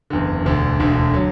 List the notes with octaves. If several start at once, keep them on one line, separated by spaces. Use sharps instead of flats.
F#1 E2 D3
E1 D2 D3
E1 D2 D3
D3 F#3